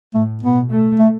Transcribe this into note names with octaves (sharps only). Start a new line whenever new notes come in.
A2 A3
B2 B3
A3
A3